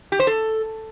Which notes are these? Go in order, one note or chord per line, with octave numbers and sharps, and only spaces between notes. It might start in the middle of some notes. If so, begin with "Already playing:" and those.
G4
C5
A4